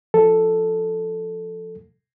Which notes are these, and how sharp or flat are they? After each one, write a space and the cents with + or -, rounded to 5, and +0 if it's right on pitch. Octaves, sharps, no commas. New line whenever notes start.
F3 +0 A4 +0